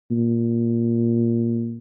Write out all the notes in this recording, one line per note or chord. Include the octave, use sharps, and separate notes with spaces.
A#2